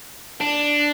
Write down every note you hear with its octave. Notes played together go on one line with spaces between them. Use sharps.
D4